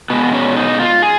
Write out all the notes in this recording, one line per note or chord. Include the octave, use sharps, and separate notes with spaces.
B2 G#3 B3
C#4
D#4
F4
G#4